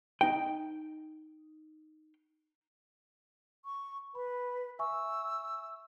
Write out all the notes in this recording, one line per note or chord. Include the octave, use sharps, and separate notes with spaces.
D#4 G5
C#6
B4 B5
E5 G#5 C#6 E6